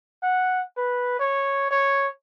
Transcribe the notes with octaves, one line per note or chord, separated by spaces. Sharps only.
F#5
B4
C#5
C#5